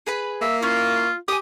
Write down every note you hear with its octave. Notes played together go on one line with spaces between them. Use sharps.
G#4 B4 B5
A#3 E5
C#4 E4 F4
G4 G#5 D#6